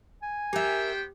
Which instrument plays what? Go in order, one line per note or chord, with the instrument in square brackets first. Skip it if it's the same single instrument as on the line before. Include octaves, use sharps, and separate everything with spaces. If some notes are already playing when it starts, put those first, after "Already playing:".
[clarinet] G#5
[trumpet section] B3 C5 G5 [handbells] G4 [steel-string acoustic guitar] A#4 E5